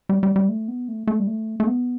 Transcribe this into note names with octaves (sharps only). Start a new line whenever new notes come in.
G3
G3
G3
A3
B3
A3
A3
G3
A3
A3
B3